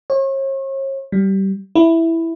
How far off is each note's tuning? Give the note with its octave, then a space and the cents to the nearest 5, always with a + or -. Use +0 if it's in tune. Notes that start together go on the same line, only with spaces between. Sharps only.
C#5 -40
G3 -20
E4 +0